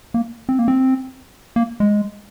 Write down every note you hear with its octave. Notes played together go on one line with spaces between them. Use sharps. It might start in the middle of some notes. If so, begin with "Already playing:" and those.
A#3
C4
A#3
C4
A#3
G#3